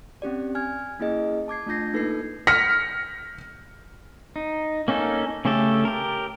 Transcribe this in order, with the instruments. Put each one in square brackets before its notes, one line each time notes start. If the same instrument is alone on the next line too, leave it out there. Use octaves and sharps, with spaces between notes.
[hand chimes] C4 C#4 G4 D5
G#5 F6 G#6
A#3 C#4 E4 G#4 D#5
A5 D6 G#6 C7
A3 D4 F4 G6 A#6 C7
A#3 D#4 A4 B4 G#6 C7
[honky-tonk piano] F6 A#6 B6 C#7
[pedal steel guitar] D#4
A#3 C#4 D#4 A4
C#3 A3 C#4 G4 A4
G4 A#4